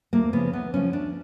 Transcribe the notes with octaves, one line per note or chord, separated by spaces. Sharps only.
D2 A#3
C#3 F3 B3
D2 B3
C#3 F3 C#4
D2 D4